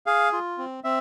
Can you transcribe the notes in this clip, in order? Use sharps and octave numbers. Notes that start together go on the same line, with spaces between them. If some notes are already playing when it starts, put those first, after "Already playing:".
G#4 F5
F4
C4
C4 E5